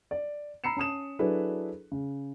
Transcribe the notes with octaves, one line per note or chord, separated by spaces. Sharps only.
D5
A#5 B5 E6 C7 C#7 E7
C#4 A5 D#6 E7
F#3 D4 E4 G#4 A4 B4
C#3